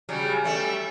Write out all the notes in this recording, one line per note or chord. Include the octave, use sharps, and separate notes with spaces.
C#3 F#3 G3
G3 A3 C#4